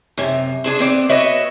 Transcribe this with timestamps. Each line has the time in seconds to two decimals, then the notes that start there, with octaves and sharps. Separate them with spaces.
0.18 F#2 C3
0.64 D4 G#4 C5
0.79 B3 C4 D5
1.09 B3 F#4 B4 C#5 D#5 E5